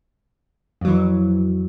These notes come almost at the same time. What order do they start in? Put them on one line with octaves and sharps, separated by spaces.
F2 F#3 E3